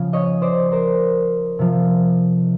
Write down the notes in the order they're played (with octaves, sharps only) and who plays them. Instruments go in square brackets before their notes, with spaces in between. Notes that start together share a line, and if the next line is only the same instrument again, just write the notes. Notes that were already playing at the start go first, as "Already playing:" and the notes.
Already playing: [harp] C#3 F3
C#5 D#5
C5 D5
A#4 C5
C3 F3